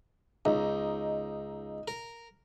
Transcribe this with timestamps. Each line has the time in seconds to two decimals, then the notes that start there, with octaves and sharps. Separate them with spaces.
0.45 C#2 D#4
1.88 A#4